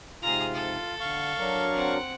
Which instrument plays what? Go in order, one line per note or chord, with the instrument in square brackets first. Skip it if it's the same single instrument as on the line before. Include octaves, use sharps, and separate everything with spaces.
[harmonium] G#2 C3 [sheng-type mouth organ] F4 [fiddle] G#4 A#5
[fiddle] A4
[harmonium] D3 [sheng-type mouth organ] F5 C#6
[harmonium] F#3 D4 A#4
[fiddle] C4 F#5